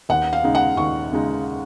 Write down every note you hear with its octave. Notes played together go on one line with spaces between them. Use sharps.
D#2 F#5
F5
C#3 G#3 D#4
F#5
D#2 C#6
C#3 G#3 D#4